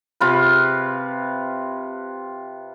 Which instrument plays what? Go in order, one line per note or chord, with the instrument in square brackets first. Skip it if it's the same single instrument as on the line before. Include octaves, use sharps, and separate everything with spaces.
[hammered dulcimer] C3 F4 B4